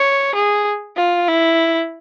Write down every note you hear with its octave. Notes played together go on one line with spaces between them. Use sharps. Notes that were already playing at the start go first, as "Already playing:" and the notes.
Already playing: C#5
G#4
F4
E4